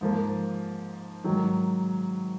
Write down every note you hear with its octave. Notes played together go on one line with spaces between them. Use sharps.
G#2 F3 A#3
G#2 D#3 F#3